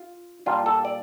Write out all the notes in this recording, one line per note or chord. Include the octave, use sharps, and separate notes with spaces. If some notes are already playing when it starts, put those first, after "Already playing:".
Already playing: F4
A#2 G3 D4 F4
A4
D5